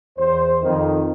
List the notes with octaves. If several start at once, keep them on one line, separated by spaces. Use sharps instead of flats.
E2 C5
F2 D#3